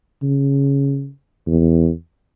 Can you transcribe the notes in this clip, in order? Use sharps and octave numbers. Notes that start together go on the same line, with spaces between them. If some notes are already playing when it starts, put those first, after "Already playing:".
C#3
E2